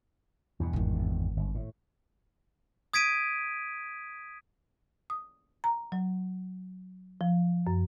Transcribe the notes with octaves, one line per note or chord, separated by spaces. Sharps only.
E2 G2 B2
G#1 D#3
G1
A2
D#6 G#6 B6 D7 D#7
D#6
A#5
F#3
F3
F#2